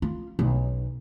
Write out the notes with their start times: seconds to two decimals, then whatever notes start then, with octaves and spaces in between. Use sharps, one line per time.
0.02 F4
0.39 B1